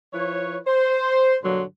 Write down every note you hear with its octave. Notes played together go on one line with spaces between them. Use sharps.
F3 E4 B4 C#5
C5
G2 B2 D3 F#3 A#3 C6